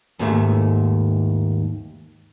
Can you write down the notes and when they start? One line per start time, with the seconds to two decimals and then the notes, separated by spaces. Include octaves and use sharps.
0.19 D#2 G#2 A3